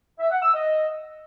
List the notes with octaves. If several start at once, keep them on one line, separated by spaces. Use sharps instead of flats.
E5
F#5
E6
D#5